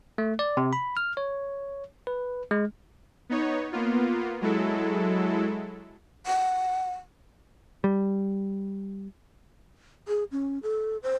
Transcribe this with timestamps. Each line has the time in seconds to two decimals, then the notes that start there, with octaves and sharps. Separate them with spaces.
0.18 A3
0.39 D5
0.57 C3
0.73 B5
0.97 F6
1.17 C#5
2.07 B4
2.51 G#3
3.29 B3 D#4 C#5
3.72 A#3 B3 F4
4.41 F#3 G#3 E4 A4
6.26 F#5
7.84 G3
10.08 G#4
10.32 C#4
10.63 A4
11.03 C5